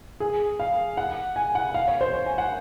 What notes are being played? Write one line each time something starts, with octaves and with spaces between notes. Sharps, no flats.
G#4
F5
F#5
G#5
F#5
F5
C#5
C5
C#5
G#5
F#5